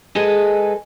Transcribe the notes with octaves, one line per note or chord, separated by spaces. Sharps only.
G#3 G#4 A4 B4 D#5